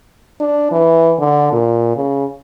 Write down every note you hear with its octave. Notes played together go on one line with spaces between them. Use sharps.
D4
E3
D3
A#2
C#3